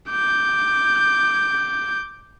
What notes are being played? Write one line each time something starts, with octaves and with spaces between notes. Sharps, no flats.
D6 G6